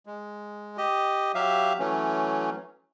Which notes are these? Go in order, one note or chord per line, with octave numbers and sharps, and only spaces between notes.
G#3
G4 D#5
F#3 G4 E5 F5
E3 F#3 A3 C#4